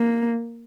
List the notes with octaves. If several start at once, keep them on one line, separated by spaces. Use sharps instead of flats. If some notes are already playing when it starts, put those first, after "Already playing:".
Already playing: A#3